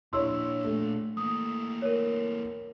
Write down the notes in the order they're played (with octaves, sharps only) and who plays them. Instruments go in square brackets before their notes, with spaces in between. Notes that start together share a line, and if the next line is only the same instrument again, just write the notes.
[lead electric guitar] A#2 D4 [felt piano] E4 C#5 [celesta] C6 E6
[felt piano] A3
[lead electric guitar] E3 A#3 [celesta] D#6
[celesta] A#4 C#5